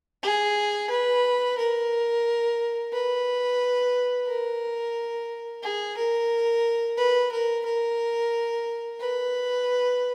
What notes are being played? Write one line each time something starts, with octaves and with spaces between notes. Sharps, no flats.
G#4
B4
A#4
B4
A#4
G#4
A#4
B4
A#4
A#4
B4